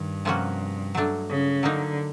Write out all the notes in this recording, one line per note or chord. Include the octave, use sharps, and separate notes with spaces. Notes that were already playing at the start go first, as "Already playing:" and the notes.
Already playing: G2 D#3
C3 F3 A#3 C#4 F#4
F#3 A3 D4
C#3
D3 F#3 A#3 D#4